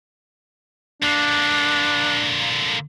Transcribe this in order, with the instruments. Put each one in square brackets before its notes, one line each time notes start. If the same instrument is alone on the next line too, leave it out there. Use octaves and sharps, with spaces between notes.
[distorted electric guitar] D3 A#3 [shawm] D4